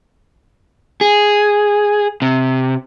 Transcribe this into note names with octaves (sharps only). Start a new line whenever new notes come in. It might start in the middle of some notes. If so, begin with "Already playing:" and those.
G#4
C3